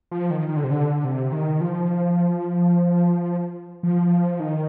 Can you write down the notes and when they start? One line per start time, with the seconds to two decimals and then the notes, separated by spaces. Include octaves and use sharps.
0.11 F3
0.31 D#3
0.49 D#3
0.57 D3
0.64 C3
0.71 D3
1.05 C3
1.32 D#3
1.61 F3
3.83 F3
4.40 D#3